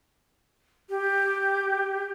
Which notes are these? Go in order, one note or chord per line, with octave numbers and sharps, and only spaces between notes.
G4